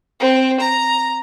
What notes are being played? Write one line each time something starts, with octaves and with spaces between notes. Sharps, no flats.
C4
A#5